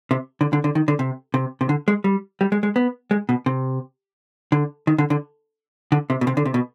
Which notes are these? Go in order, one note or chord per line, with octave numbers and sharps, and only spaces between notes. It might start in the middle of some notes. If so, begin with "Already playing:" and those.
C3
D3
D3
D3
D#3
D3
C3
C3
C3
D3
G#3
G3
G3
G#3
G#3
B3
G#3
B2
C3
D3
D#3
D3
D3
D3
C3
B2
C3
D3
C3
B2